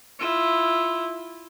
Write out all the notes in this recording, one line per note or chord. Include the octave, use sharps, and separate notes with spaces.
E4 F4